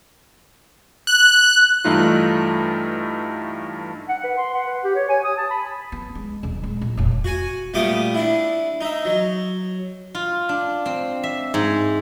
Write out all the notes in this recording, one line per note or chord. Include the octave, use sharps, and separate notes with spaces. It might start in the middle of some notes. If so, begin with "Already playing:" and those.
F#6
G2 E3 A3 D#4 F4
F#5
B4
C6
F#5
B4
G4
C#5
G#5
D#6
A5
B5
B3
G#3
D#1 F#2
G#3
A#1
E1 A2
F#4 G#5
A#2 G3 A3 B3 D6 D#6
D4 E4
D#4 E5
F#3
F4
D4
C4
E5
G#2